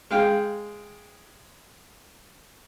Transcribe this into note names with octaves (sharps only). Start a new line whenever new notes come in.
G#3 F5 G5